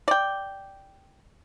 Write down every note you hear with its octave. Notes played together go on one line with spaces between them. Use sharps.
D5 G5